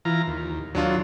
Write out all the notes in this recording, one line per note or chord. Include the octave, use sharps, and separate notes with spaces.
E3 F4 A#5
D#2
D#2 F#3 D4 F4